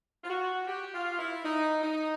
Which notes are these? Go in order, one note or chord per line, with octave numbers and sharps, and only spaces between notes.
F4
F#4
G4
F4
E4
D#4
D#4